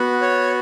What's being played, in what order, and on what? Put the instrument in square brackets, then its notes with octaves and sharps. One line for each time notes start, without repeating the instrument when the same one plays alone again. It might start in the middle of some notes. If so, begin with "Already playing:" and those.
Already playing: [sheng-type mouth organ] B3 F#4
C#5